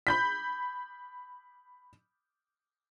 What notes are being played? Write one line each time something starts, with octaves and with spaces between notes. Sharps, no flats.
B5 G6 B6